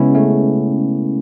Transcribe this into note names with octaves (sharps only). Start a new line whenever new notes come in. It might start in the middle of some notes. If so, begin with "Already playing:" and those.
Already playing: C#3 G#3 B3 C#4 E4
A3 C#4